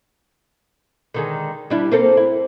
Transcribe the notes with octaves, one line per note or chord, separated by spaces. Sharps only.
D3 D#3 G#3
G3 D4 E4
A#3 C4 A4
E4